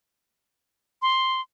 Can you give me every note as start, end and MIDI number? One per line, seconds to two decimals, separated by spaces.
1.02 1.41 84